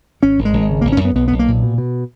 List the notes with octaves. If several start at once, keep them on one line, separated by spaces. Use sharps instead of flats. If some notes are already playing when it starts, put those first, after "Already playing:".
G#1 C#4
G#1
G#3
G#1
C#3
G#1 A#3
C#4
F#2 B3
B1 B3
B1 B3
A#3
A#2
B2
B2